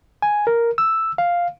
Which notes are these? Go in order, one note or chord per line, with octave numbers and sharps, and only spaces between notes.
G#5
A#4
E6
F5